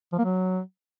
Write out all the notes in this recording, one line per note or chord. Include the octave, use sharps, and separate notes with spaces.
F3
A#3
F#3